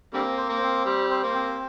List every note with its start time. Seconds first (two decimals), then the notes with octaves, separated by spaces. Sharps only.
0.13 D3 G3 A#3 C4
0.37 C5
0.49 A#3
0.62 C4
0.86 G3 C5
1.10 C5
1.23 A#3
1.34 C4